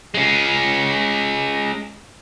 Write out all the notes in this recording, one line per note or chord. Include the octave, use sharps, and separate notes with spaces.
G#3 C#4